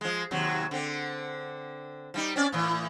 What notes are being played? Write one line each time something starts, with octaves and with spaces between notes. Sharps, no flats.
F3 G#3
D#2 C3 F#3
D3 C4
F3 G3 D#4
C4 C#4 D5
A2 E3